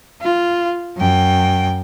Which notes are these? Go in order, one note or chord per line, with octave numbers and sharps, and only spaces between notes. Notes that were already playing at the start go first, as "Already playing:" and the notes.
F4
F#2 G5